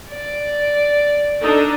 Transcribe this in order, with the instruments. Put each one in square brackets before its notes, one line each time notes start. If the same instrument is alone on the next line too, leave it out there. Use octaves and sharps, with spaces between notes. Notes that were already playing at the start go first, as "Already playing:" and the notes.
[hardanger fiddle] D5
[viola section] D4 D#4 A4